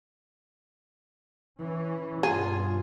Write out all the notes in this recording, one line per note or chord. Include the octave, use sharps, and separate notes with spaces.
E3 C#4
G2 B2 F4 G#4